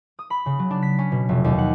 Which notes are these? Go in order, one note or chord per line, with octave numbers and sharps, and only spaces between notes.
D#6
B5
C#3
F#3
D4
B6
C#4
B2
F1
D#2
F#5